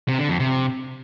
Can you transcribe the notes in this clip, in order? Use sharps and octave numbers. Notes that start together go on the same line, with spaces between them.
C3
D3
F2
C3